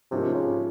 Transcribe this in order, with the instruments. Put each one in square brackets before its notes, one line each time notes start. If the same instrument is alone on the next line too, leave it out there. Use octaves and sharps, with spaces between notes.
[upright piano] G#2 F3 A#3 C#4 [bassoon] C3
[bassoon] C#3